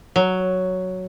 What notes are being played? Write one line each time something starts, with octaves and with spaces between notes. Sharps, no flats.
F#3